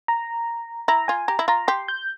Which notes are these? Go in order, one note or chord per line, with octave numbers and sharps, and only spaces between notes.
A#5
E4 A#5
F4 G#5
G4 A#5
E4
F4 A#5
G4 C6
G6